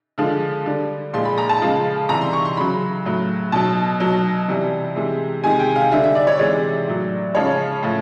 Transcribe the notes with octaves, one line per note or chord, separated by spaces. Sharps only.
D3 F3 G#3
D3 G3
A#2 F3 G#3 C6
B5
A#5
A5
C#3 F3 G#3
C3 E3 G3 A#5
C6
C#6
C6
C#3 F#3 B5
A2 F#3
B2 F#3 A5
B2 F#3
C3 E3 G3
C3 E3 G#3
C3 D#3 G#3 G#5
G5
F5
D3 G3 E5
E5
D5
C#5
C3 E3 G#3 D5
A2 F#3
C#3 F3 G#3 C#5
A2 F3